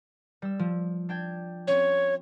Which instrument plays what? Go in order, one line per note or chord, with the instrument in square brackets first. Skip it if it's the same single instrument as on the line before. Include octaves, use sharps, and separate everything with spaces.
[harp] G3 E6
F3
D4 G5 G#6
[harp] C4 C#4 [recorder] C#5